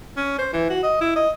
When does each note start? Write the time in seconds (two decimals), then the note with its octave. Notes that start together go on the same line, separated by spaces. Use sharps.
0.17 C#4
0.38 C5
0.53 E3
0.70 F#4
0.83 D#5
1.01 E4
1.16 D#5